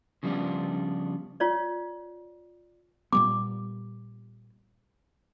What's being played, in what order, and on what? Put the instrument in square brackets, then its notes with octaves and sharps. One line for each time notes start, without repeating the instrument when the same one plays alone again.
[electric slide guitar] C#3 F3 G3 B3 D4 F4
[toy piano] F4 C#5 D5
[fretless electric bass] A#2 G3 B3 [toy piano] D6